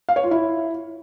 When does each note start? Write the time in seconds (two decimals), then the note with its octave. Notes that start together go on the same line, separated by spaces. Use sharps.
0.09 F5
0.16 C#5
0.24 F4
0.31 E4